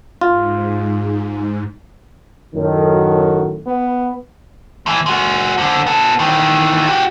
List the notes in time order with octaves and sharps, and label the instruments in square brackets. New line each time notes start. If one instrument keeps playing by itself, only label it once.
[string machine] G#2 [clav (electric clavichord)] F4
[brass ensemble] F#2 A2 D#3
[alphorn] F#4
B3
[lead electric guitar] A2 E3
G#3 F#4
F2 D3
B3 A4
D#3 E3
F#4 G4